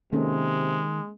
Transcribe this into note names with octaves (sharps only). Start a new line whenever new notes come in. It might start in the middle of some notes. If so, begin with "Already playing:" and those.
C3 D#3 G#3 A#3 C#4 A4